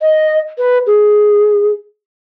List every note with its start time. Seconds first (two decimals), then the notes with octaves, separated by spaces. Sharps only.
0.02 D#5
0.58 B4
0.87 G#4